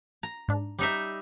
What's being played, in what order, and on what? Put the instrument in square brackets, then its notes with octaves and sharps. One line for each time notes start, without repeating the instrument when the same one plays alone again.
[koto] A#5
[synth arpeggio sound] G#2 D4
[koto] G3 D#4 E5